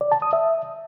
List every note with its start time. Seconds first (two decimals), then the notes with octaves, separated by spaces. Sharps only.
0.01 D5
0.12 A5
0.22 D#6
0.33 E5